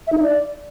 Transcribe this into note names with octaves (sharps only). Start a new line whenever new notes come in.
E5
D#4
E5
D5